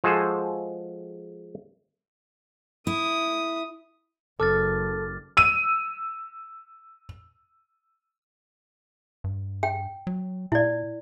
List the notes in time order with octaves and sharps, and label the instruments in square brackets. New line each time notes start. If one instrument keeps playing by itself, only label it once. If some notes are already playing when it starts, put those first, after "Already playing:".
[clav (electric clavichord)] F3 G#3 F#4 G#4 A4 C5
[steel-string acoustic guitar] E4 [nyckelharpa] D#6
[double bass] F#1 [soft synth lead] A4 [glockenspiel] D6 F6 A6
[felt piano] E6 D#7
[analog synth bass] G2
[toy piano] G5
[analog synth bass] F#3
[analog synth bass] A#2 [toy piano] E4 D5